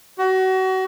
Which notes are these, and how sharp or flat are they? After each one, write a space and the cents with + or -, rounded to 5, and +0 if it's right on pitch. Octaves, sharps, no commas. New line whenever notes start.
F#4 +30